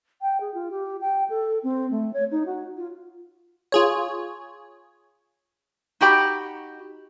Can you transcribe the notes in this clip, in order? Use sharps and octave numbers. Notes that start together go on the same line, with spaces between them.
G5
G#4
F4
G4
G5
A4
C4
A3
C#5
D#4
F#4
F4
F4 G#4 C#5
D#4 F#4 G4 B5